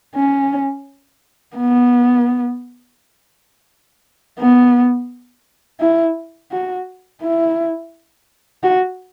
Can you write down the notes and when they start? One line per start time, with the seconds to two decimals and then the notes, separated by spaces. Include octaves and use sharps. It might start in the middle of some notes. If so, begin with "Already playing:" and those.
0.16 C#4
1.57 B3
4.39 B3
5.80 E4
6.51 F#4
7.22 E4
8.63 F#4